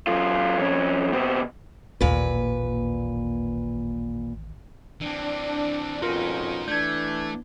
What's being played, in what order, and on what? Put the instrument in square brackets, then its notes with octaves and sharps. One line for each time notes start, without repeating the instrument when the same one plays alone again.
[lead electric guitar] F#2 F4
F2 C#4
B2 C4
[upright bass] A1 D#2 [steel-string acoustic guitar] A#2 B4
[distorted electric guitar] E3 C4 [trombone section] D4
[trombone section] F2 B2 C#4 [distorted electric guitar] D#4 C5 [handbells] F4 A#4
[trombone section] E3 D4 [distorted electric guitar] A3 [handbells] G6 G#6